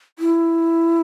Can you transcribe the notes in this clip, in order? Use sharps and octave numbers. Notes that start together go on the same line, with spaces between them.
E4